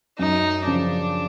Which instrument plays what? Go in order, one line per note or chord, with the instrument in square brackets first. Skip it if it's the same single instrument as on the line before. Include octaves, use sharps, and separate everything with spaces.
[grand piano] F#2 [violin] D#4
[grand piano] C#3 F3 [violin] D4